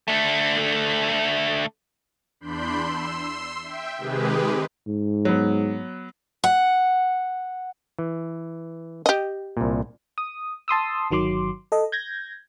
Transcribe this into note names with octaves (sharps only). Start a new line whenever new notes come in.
D3 A3
E2 D4 B5 C6 G6
C6 E6
E5 G5
C3 D#3 G#3 G4 G#4 B4
G#2
F#3 B3
F#5
E3
G4 D#5
C2 A#2
D#6
A5 C6 D#6 E6
G1 D#3 F#3 C6 D6
A4 D#5
G6 G#6 A#6